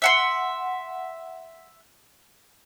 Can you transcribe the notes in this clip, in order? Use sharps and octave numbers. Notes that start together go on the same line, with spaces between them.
E5 F#5 C6